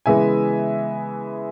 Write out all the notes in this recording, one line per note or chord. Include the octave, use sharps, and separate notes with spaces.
C#3 E3 G#3 B3 E5 G#5